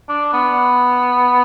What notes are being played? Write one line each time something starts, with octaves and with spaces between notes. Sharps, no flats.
D4
B3